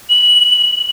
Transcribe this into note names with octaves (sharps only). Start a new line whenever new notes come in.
F#7